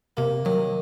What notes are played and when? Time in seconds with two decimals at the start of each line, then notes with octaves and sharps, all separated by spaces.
0.17 C3 A#3
0.45 D#3 F#3